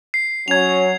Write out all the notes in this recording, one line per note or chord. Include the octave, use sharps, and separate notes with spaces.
C7
F#3 C#4 G#6 F7